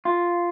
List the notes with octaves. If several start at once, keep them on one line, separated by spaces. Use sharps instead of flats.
F4